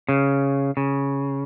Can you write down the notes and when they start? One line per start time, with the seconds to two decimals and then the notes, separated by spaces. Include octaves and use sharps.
0.09 C#3
0.77 C#3